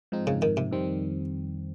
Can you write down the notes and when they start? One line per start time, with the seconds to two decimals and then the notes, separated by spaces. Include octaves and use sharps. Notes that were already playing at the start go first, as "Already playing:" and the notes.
0.12 G#2 F3 C4 D#4
0.27 C#3
0.42 D#3
0.57 C3
0.71 F2 D#3 G3 C4